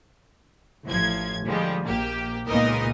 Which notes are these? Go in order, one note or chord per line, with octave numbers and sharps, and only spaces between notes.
A1 F3 G#6
D3 F3 G3 G#3
A#1 A#3 G4
C#2 A#2 B3 D#4 A#4 D#5